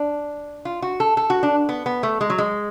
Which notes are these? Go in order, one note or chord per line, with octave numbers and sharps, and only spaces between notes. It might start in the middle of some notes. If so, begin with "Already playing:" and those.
Already playing: D4
F4
F#4
A4
A4
F#4
D4
B3
B3
A3
G#3
F#3
G#3